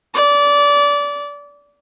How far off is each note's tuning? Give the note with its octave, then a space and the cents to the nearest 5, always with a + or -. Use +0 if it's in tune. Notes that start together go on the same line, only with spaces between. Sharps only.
D5 -25